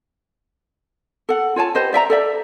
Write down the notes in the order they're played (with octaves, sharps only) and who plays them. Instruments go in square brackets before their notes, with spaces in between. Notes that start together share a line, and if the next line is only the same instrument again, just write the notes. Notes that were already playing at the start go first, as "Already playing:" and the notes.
[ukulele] A4 F#5
F4 C#5 G#5 A5
G4 B4 C5 D#5
D5 E5 G5 A#5
A4 D5 E5